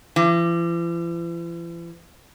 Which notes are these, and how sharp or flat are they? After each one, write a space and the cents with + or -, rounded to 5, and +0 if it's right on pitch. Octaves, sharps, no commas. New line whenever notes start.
E3 +45